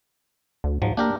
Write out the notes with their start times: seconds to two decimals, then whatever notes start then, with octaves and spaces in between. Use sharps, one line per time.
0.64 D2
0.82 G#2 F3 F#3
0.97 A#3 D4 G4 A#4